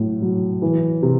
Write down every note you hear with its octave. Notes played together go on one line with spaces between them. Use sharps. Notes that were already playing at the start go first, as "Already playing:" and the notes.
Already playing: A2 F#3
F#3
E3
C3